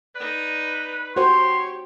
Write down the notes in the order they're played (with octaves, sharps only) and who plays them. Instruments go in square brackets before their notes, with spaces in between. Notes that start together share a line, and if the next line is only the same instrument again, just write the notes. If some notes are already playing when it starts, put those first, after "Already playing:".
[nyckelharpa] D#4 D5 [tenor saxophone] B4
[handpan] F#4 C5 [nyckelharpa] G4 [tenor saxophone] C#5 [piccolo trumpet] C6